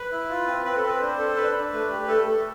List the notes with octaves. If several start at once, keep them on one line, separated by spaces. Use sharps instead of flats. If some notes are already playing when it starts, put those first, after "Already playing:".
Already playing: B4
E4
F4
C4
C4 B4
A4
C4
B4
D4 C5
A4
D4 B4
D4
A3
G4
A3 A4
A3